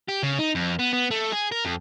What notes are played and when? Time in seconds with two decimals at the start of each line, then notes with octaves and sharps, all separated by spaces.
0.08 G4
0.23 C#3
0.39 D#4
0.55 F2
0.79 B3
0.93 B3
1.11 A3
1.32 G#4
1.52 A#4
1.65 F2